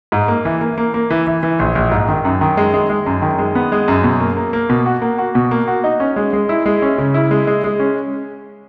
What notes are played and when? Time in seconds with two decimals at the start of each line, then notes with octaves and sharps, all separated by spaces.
0.12 G#2
0.28 A#3
0.45 E3
0.61 A#3
0.78 A#3
0.94 A#3
1.10 E3
1.27 E3
1.43 E3
1.59 A#1
1.75 A#1
1.92 G#2
2.08 D#3
2.25 F#2
2.41 D#3
2.57 G#3
2.74 G#3
2.90 G#3
3.06 F#2
3.22 D#3
3.39 G#3
3.55 B3
3.72 G#3
3.88 F#2
4.04 B2
4.20 A#3
4.37 A#3
4.53 A#3
4.70 B2
4.86 F#4
5.02 A#3
5.18 F#4
5.35 B2
5.51 A#3
5.68 F#4
5.84 D#4
6.00 C#4
6.16 G#3
6.33 G#3
6.49 E4
6.66 G#3
6.82 C#4
6.98 C#3
7.14 E4
7.31 G#3
7.47 G#3
7.64 G#3
7.80 C#4